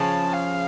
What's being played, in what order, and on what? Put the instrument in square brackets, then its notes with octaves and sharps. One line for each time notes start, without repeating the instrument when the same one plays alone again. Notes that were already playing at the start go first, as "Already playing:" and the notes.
Already playing: [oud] C#3 F3 [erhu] A5
[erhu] F5